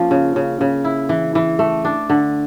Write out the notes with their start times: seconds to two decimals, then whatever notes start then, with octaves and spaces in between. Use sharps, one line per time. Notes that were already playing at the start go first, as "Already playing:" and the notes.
Already playing: F3 A#3 C#4
0.11 C#3
0.36 C#3
0.61 C#3
0.85 E4
1.09 E3
1.35 E3
1.59 A3
1.85 D4
2.10 D3